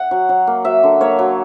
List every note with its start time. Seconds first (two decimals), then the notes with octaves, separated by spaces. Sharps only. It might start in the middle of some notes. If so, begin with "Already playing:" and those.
Already playing: F#5
0.11 F#3
0.29 F#3
0.47 A#3
0.65 F#3 E5
0.83 D3
1.00 A#3 C#5
1.19 F#3